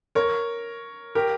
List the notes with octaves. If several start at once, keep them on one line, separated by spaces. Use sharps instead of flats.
A#4 C#5
G4 A#4